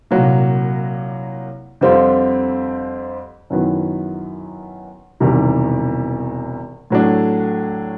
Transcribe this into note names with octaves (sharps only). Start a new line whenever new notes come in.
C2 A#2 F#3 A#3
F2 D3 G3 C4 F4
F#2 D#3 F#3 B3 E4
E1 E2 C3 D#3 G3
A2 F#3 A3 D4